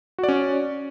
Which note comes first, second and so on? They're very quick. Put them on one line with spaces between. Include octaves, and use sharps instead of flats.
F#4 D5 C#4